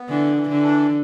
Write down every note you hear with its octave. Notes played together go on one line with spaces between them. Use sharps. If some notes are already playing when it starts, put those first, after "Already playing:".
Already playing: B3
D3 E3
E3
D3
D4